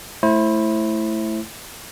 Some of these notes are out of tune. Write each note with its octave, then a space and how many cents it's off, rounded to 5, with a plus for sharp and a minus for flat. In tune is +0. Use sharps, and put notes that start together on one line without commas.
A3 -5 E4 +0 C5 +30